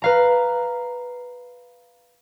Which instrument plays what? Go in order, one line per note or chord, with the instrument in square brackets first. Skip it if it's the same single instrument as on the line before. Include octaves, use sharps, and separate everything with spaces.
[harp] B4 F5 A#5